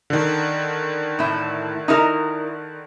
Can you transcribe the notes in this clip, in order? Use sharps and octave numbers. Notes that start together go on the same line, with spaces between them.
D3 D#3
A2 E4
D#4 E4 A#4